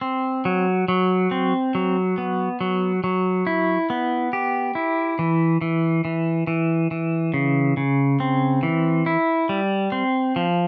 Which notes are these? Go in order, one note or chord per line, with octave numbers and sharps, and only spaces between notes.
C4
F#3
F#3
C4
F#3
B3
F#3
F#3
E4
B3
G4
E4
E3
E3
E3
E3
E3
C#3
C#3
C4
E3
E4
G3
C4
F3